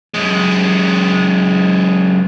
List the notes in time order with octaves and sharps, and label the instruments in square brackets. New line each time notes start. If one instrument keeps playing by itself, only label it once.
[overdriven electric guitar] F#2 G#3